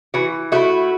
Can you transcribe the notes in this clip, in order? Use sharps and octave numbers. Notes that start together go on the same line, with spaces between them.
E3 F#4
A3 E4 F#4